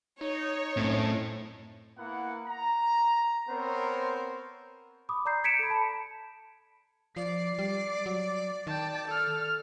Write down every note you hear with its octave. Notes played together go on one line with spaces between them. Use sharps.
D#4 C#5
F#2 A2 C4
A#3 B3 E4 F#5
A#5
B3 C4 A#4 C5 C#5
B5 D6 D#6
D5 A#5 G6 C7
G#6 B6 C#7 D7 E7
A4 B5
A5 B5
F3 D5 C7
G3
F#3
D#3 G5 A5
A4 F6